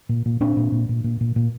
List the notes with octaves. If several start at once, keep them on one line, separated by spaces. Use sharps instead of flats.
A#2
A#2
A#2 C4 D4
A#2
A#2
A#2
A#2
A#2
A#2